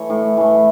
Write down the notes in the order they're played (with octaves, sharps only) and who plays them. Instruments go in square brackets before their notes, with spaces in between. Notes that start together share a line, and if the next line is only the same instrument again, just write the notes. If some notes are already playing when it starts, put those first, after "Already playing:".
Already playing: [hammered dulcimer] E3 A3 C#5
A2
E3 A3